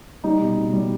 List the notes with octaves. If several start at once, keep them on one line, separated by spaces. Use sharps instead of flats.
G3 D#4
B2
B2
G3